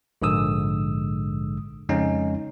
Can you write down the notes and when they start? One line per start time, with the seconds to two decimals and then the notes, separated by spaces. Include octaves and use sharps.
0.22 A#1 G#2 D3 G#3 D#6 E6
1.89 F2 C#3 G#3 C#4 D#4